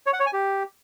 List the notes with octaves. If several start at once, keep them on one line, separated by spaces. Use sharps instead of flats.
C#5
F#5
C#5
G#5
G4